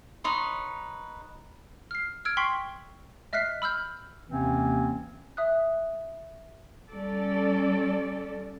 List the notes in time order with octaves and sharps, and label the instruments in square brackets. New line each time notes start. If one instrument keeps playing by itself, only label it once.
[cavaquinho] D#4 B4 C#5 C6
[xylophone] F6 C7
E6 F6 G#6 D7
G5 C6 C#6 B6 C7 F#7
D#5 E5 F6 F#6 B6 C7
B5 E6 F6 G6
[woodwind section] D#2 C3 E3 A#3 C4 C#4
[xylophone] E5 D#6 F#6
[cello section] G3 C#4 A4 D5